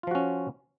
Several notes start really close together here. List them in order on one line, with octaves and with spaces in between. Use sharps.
F4 F3 F#4 C#4